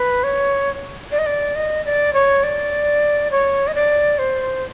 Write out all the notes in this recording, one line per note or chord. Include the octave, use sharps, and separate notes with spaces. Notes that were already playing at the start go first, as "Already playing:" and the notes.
Already playing: B4
C#5
D5
D#5
D5
D#5
D5
C#5
D5
C#5
D#5
D5
C5